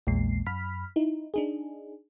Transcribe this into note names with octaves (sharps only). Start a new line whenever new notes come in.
A#1 E2 A#2 G#3 C7
F#2 B5 F6 B6
D#4 E4
D4 D#4 G#4